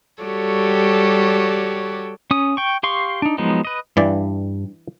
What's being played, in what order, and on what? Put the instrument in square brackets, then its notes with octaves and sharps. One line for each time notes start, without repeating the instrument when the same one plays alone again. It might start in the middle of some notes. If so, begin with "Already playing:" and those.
[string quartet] G3 F#4 G4 A4 C#5 D5
[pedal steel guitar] C#4 D#6
G5 C#6
G4 F5 C6 C#6
D4 D#4
F3 F#3 G#3 B3 D#4
B4 D#5
[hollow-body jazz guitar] G2 [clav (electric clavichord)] E3 D5